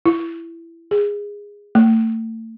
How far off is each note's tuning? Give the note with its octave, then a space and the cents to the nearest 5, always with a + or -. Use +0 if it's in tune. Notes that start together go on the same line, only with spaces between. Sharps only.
E4 +15
G#4 -20
A3 +35